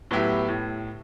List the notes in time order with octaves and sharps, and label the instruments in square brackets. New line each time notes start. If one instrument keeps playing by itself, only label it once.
[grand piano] A2 F#3 B3 E4 G4
A2